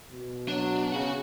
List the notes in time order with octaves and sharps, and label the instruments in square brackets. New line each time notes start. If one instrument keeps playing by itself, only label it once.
[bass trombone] B2
[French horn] F#3 [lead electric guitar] D4
[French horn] C#3 [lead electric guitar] F#4 F#5